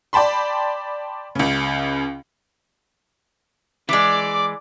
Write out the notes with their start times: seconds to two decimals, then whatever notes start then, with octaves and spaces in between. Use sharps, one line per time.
0.13 D5 G5 A5 B5 C6
1.35 C#2 C#3
3.89 E3 G#3 D5 D6